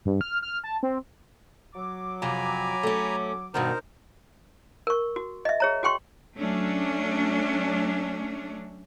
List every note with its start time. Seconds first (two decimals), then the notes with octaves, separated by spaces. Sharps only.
0.05 G2
0.21 F6
0.42 F6
0.64 A5
0.83 C4
1.75 F#3 D6
2.22 F2 C3 G#5 A#5 B5
2.83 A3 C#4
3.54 G2 B2 D#3 D#4 A#4 C5
4.87 A#4 C#6
5.16 F#4
5.45 D#5 E5
5.60 G#4 C#5 A#5
5.83 F#4 G#4 G5 C6 C#6
6.36 F#3 A3 C#4 D4